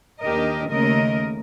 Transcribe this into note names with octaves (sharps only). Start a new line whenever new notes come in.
D#2 D4 G4 A#4 D#5
D#2 C#3 A3 A#4 D#5